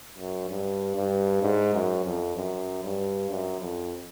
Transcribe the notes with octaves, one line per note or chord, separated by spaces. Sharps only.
F#2
G2
G2
G#2
F#2
F2
F#2
G2
F#2
F2